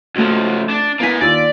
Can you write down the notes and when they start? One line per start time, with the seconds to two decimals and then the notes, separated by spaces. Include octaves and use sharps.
0.16 C#2 F3 A3 F#4
0.70 D4
1.00 A#3 B3 E4 G#5 B6
1.21 D#2 F4 D5 E6